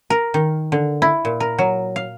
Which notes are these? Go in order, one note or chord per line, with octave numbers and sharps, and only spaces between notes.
A#4
D#3
D3
E4
A#2
A#4
F#3
F5